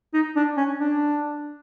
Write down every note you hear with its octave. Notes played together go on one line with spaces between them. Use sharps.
D#4
D4
C#4
D4